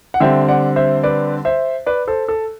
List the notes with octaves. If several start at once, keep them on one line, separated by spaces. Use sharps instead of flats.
F#5
D3 G3 C4 E5 G5
D5 F#5
C5 E5
B4 D5
C5 E5
B4 D5
A4 C5
A4